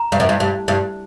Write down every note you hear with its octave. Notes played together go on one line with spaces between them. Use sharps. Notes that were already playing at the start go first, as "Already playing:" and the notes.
Already playing: A#5
G2
F#2
G2
G2
G2